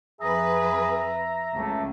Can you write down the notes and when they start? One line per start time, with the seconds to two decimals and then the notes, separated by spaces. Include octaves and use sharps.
0.21 F2 G#4 B4 E5 A#5
1.55 C#2 A3